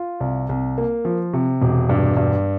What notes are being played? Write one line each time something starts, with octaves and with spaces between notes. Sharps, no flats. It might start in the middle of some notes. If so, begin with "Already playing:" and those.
Already playing: F4
C2
C2
A#3
F3
C3
E1
G2
G2